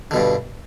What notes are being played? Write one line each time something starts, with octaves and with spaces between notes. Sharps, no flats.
G2 B2 D3